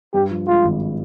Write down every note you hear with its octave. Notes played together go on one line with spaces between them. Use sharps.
G2 G4
F3
G#3 F4
G#1